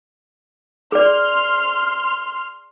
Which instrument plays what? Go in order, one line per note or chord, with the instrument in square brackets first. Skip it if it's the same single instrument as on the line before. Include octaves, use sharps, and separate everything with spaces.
[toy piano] G#4 D5 [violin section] C6 F6